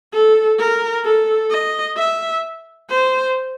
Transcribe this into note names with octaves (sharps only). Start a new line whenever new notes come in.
A4
A#4
A4
D#5
E5
C5